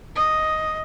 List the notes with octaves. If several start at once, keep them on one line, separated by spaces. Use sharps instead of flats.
D#5